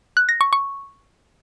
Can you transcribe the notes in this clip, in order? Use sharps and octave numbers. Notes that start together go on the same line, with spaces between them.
F#6
A#6
C#6
C#6